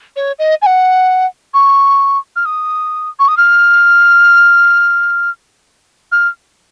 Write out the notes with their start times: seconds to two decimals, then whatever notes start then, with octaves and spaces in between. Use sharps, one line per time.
0.16 C#5
0.39 D#5
0.62 G#5
0.66 F#5
1.54 C#6
2.36 F6
2.45 D#6
3.19 C#6
3.28 D#6
3.37 F6
6.12 F6